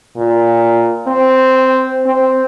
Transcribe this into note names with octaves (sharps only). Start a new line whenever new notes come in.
A#2
C4
C4